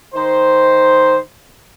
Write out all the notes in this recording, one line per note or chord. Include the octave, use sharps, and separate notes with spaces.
D#3 D#4 C5